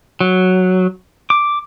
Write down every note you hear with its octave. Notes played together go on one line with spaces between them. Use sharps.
F#3
D6